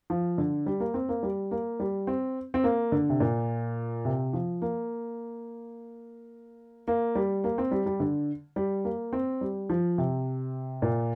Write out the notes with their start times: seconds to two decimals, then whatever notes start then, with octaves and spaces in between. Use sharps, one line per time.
0.10 F3
0.38 D3
0.66 G3
0.80 A#3
0.94 C4
1.09 A#3
1.23 G3
1.51 A#3
1.80 G3
2.07 C4
2.54 C4
2.64 A#3
2.92 D3
3.09 C3
3.20 A#2
4.05 C3
4.33 F3
4.62 A#3
6.88 A#3
7.15 G3
7.44 A#3
7.58 C4
7.71 G3
7.86 G3
8.00 D3
8.56 G3
8.85 A#3
9.13 C4
9.41 G3
9.70 F3
9.98 C3
10.82 A#2